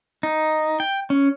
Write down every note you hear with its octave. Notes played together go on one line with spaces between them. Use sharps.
D#4
G5
C#4